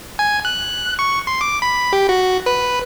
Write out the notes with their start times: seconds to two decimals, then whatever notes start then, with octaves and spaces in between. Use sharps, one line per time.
0.19 G#5
0.45 F#6
0.99 C#6
1.27 C6
1.41 D6
1.62 B5
1.93 G4
2.09 F#4
2.46 B4